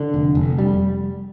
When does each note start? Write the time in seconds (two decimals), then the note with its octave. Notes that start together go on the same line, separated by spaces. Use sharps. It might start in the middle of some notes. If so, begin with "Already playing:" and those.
Already playing: D3
0.14 F1
0.35 F1
0.58 G3